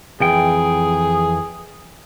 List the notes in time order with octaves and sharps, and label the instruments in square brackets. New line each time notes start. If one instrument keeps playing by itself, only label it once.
[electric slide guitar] F2 E3 G5 [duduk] G#4